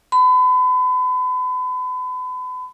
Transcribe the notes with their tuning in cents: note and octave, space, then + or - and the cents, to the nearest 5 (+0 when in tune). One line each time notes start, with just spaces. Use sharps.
B5 +35